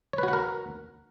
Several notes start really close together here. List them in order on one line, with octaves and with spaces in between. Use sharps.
C#5 B4 F#4 F#5 A#4